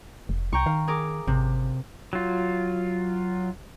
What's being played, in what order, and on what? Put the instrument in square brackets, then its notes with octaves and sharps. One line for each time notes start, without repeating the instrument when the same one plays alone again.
[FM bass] F1
[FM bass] C2 [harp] G5 A#5 C#6
[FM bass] D#3 [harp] F5
[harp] G#4 A#4 D6
[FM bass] G#1 [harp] C3
[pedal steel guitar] F#3 F4